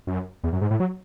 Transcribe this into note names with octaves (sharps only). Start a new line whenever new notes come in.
F#2
E2
F#2
G#2
A2
F#3